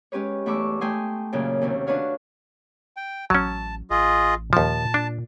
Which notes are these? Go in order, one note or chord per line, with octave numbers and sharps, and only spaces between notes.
G#3 C#4 G4 B4 C#5
E2 A3 B5 C#6 D6 E6
A3 G5 G#5 C6 D#6
F#2 A#2 C#3
D#2 C3 C#4
D4 F#4 B4 C#5 F5
G5
A1 F#3 C#4 A5
A1 F4 G#4 D#5
D#2 A#2 F3 A5
D4